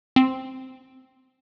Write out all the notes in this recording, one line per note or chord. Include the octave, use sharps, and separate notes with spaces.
C4